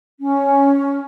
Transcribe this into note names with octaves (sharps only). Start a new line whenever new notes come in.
C#4